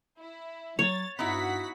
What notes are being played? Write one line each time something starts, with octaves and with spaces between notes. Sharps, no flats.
E4
F#3 C#5 A6
G2 B3 D#4 E4 F#4 F#5 B6